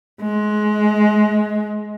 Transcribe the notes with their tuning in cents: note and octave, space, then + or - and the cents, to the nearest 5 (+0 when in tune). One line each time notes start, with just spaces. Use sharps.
G#3 +25